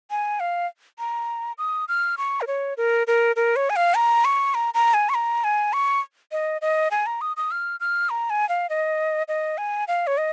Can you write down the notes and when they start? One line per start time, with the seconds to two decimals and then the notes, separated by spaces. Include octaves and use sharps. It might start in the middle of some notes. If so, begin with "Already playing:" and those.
0.11 G#5
0.40 F5
0.99 A#5
1.58 D#6
1.88 F6
2.18 C#6
2.41 A#4
2.47 C#5
2.77 A#4
3.07 A#4
3.36 A#4
3.56 C#5
3.70 G#5
3.76 F5
3.95 A#5
4.25 C#6
4.55 A#5
4.74 A#5
4.94 G#5
5.09 C#6
5.14 A#5
5.44 G#5
5.73 C#6
6.32 D#5
6.62 D#5
6.91 G#5
7.06 A#5
7.21 D#6
7.37 D#6
7.51 F6
7.80 F6
8.10 A#5
8.30 G#5
8.49 F5
8.70 D#5
9.28 D#5
9.58 G#5
9.88 F5
10.07 C#5
10.18 D#5